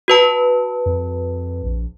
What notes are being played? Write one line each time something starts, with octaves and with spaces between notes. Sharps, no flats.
F#4 B4 A5
F2
A#1